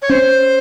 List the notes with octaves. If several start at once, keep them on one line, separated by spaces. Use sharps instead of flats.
C#5
C#4 C5